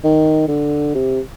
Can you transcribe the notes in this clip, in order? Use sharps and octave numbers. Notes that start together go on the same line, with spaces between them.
D#3
D3
C3